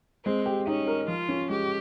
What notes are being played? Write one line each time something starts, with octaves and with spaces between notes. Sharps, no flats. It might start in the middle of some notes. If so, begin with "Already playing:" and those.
G#3 C4
G4
C#4 D#4
A#4
F3 F4
C#4
G#3 G4